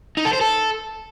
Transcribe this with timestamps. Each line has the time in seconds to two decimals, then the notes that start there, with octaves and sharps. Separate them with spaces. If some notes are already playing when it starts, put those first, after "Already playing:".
0.17 D#4
0.25 A4
0.33 C5
0.41 A4